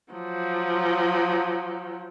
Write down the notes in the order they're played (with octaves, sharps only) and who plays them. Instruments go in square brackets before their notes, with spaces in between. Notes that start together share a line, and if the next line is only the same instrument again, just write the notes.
[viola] F3 F#3